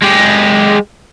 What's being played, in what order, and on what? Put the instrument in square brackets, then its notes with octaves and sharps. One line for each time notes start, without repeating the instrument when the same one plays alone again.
[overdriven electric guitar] G#3 G4